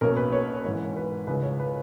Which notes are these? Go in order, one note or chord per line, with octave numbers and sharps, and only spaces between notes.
B1 B2 A#3 C#4 A#4
B4
C#5
G#1 G#2 E3
B4
C#2 C#3 G#3 C#4 B4
C#5
B4